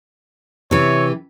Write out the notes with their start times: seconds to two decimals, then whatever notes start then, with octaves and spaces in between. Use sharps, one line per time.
0.71 C3 E3 C#5